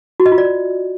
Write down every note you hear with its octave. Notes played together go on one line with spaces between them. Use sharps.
F#4
D#5
F4
D5